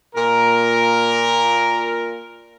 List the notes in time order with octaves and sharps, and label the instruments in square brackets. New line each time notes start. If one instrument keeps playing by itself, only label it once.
[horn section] A#2 A#4